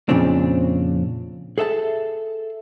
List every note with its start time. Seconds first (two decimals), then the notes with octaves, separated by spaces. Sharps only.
0.09 F2 A#2 C#3 F3 C4 D4
1.58 G#4 A4 E5 F5 A5